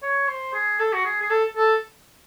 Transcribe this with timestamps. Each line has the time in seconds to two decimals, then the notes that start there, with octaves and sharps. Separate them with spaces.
0.03 C#5
0.28 C5
0.53 G#4
0.80 A4
0.93 F#4
1.05 G#4
1.21 G#4
1.30 A4
1.56 A4